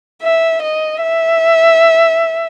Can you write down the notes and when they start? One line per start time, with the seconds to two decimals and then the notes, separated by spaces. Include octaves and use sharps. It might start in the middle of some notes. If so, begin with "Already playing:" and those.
0.22 E5
0.62 D#5
1.02 E5